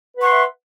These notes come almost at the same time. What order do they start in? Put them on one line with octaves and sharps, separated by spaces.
B4 F#5 C#6 C6 E5